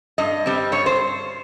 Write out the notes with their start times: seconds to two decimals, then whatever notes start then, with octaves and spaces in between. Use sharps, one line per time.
0.18 G2 D#5
0.46 G3 C4
0.72 G2 C#5
0.86 C5